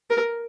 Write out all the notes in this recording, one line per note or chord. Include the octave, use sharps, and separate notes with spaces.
A#4